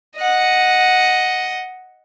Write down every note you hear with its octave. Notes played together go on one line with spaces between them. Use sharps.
D#5 F#5